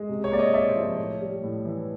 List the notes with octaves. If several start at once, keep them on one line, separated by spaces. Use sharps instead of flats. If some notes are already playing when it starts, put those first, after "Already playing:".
Already playing: G#3
C3
C#5
A#3 D5
C#5 D#5
C3 D5 E5
C5
F3
C#5
A2 C#5
G3
A2
E3